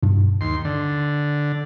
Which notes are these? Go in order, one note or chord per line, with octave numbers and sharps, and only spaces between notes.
G2 B2
D#2 C6
D3